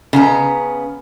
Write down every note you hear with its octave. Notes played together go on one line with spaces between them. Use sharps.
C#3 B3 A#5